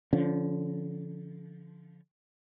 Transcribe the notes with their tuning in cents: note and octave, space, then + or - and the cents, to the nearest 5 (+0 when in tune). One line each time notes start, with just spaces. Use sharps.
D3 -25 F3 -10 C#4 +0